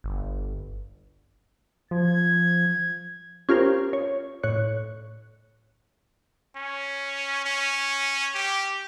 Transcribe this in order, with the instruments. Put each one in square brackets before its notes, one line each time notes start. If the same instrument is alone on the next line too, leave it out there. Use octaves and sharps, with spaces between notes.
[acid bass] G1
[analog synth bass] F3 [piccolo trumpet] G#6
[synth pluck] C#4 F4 G4 A#4 C5
C#5
A2 C#5 F#6 C#7
[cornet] C#4
C#4
G4